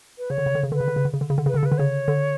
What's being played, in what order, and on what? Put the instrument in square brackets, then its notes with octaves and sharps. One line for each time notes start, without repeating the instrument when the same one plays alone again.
[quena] B4
[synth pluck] C#3 [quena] C#5
[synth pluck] D3
C#3
D3
C#3
[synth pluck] D3 [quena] B4
[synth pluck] C#3
D3
C#3
D3
C#3
D3
C#3
D3
[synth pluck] C#3 [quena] B4
[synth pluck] D3 [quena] A4
[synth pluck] C#3 [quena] B4
[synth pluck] D3
[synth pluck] C#3 [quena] C#5
[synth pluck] D3